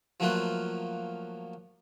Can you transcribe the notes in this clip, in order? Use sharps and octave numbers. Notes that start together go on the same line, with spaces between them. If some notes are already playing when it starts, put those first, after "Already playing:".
F3 F#3 A3 A#3 F4 B4